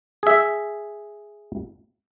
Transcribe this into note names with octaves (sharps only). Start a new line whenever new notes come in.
G#4 E5